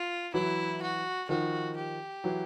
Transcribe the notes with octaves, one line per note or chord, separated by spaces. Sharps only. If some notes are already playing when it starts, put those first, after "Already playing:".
Already playing: F4
E3 F#3 E4
F#4
D#3 F3 F#4
G4
E3 F#3